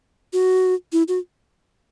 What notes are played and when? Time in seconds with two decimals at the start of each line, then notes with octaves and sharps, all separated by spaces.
0.33 F#4
0.92 E4
1.08 F#4